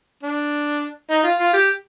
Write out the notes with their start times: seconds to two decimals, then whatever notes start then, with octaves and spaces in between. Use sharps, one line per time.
0.23 D4
1.10 D#4
1.24 F4
1.39 F4
1.53 G4